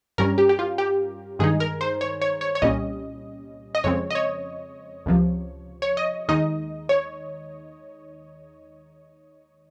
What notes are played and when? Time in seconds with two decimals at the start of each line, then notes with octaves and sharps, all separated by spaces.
0.18 G2 G3 C#4 A#4
0.38 G4
0.49 G4
0.59 F4
0.78 G4
1.39 G2 D#3 G#3 D#4 G#4
1.60 A#4
1.81 C5
2.01 C#5
2.22 C#5
2.41 C#5
2.55 C#5
2.62 C2 A#2 G3 C#4 D#5
3.75 D#5
3.84 F2 C#3 G#3 C4 C#5
4.10 D#5
4.15 C#5
5.06 C#2 C3 F3
5.82 C#5
5.97 D#5
6.28 D#2 D#3 G#3 D#4 D#5
6.89 C#5